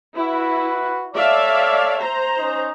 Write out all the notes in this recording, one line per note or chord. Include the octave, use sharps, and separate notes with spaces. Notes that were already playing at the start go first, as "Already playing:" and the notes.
E4 F#4 B4
A4 C#5 D5 E5 F5
C5 A#5
C#4 D#4